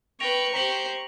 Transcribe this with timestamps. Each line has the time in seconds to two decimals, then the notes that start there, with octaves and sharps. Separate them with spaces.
0.20 B4 G5 C#6 A#6 D7 F7
0.54 G4 C5 A#5 B6 F#7